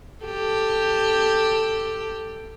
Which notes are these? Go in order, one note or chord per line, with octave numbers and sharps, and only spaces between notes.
G4 A4